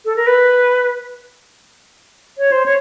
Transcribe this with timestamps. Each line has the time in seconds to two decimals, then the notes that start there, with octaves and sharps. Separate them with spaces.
0.05 A4
0.16 A#4
0.27 B4
2.38 C#5
2.52 C5
2.66 C#5